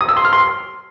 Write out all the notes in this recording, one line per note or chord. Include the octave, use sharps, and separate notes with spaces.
D#6
E6
C6
F6
C6